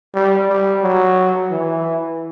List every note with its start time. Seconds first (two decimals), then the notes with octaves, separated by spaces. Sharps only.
0.14 G3
0.49 G3
0.83 F#3
1.51 E3